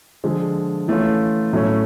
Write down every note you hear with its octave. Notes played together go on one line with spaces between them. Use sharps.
D3 F3 G#3
E3 A3 C#4 F4
A2 F#3 A3 C#4